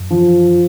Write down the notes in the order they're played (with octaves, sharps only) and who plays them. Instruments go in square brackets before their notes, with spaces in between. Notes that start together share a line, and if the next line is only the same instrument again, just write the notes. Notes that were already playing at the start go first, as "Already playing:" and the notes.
Already playing: [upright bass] F#2
[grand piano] F3